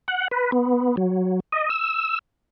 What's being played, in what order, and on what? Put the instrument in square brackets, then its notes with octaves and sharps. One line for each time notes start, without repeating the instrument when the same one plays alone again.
[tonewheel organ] F#5
B4
B3
F#3
D#5
E6